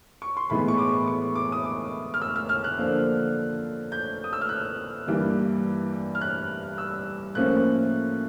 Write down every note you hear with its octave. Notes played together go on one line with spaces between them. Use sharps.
C#6
C6
A2 E3 G#3 B3 B5
C#6
D6
C#6
D6
D#6
D6
F6
E6
F6
F6
F#6
D3 F3 A#3 D4
G6
D#6
E6
F6
F#6
G2 E3 G3 A#3
F6
F#6
E6
A2 F3 A#3 C#4 F#6